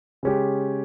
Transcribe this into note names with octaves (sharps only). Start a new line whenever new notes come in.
C#3 G#3 C#4 G4